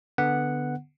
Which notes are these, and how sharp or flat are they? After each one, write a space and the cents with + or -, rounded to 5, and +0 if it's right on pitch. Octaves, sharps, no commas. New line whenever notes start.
D3 +0 B3 +0 F#5 +0